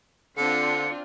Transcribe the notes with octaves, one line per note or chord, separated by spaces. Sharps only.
D3 C4 D4 F4 C#7